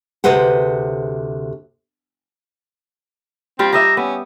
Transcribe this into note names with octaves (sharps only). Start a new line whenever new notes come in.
D2 C3 G#4 B4 C5 F#5
G3 C4 F4
G4 D#5 E5 A#5
B3 C#4